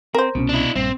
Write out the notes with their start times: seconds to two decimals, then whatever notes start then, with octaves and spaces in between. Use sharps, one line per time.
0.14 C4 A#4 C5
0.35 C2 B2 C4 C#4
0.49 D4 E4
0.76 A#1 G2 C4